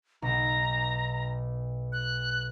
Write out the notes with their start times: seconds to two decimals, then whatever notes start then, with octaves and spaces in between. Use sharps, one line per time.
0.22 B1 A#5
1.92 F#6